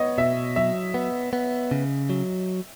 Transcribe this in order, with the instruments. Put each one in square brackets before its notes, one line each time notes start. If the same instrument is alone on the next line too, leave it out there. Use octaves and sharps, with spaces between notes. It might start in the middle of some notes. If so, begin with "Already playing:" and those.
Already playing: [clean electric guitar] B3 [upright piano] C#5 D#5
[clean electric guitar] B2 [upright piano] E5
[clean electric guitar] F#3 [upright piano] E5
[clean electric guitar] B3
B3
C#3
F#3